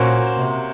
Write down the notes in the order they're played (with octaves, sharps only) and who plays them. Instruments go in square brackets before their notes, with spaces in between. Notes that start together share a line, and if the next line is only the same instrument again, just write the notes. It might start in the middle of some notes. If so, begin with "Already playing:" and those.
Already playing: [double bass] A#2 [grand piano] A#3 C#4 F#4 C5
[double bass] C3